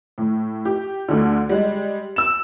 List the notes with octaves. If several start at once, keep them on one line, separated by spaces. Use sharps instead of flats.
A2
G4
D2 D3
G3 G#3
E6 E7